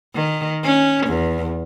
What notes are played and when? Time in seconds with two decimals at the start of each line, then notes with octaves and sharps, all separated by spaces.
0.15 D#3
0.63 C#4
1.07 E2